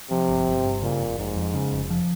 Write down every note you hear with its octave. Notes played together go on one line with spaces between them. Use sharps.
C3 F3
G1
G1
G2
A#2 C#3
F1
F1 G#2
F2
C#3
F1
F3